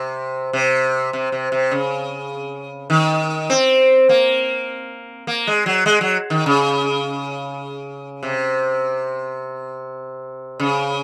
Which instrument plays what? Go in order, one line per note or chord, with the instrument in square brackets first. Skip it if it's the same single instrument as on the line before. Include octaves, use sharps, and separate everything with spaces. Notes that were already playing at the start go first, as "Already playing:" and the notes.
Already playing: [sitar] C3
C3
C3
C3
C3
C#3
D#3
C4
A#3
A#3
G#3
F#3
G#3
F#3
D#3
C#3
C3
C#3